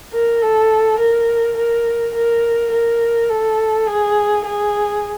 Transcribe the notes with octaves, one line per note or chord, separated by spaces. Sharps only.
A#4
A4
A#4
A#4
A#4
A#4
A4
G#4
G#4